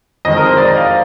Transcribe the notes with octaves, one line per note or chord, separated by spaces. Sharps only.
F2 D#3 G#3 D#5
A#4
C5
D5
D#5
F5